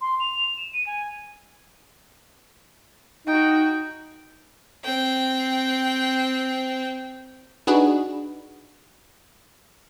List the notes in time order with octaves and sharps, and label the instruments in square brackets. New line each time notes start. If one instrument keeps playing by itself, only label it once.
[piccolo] C6
F7
E7
D#7
G#5
[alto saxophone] D#4 [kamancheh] F#4 G5
[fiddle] C4 G5
[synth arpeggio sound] D4 D#4 F#4 G#4 B4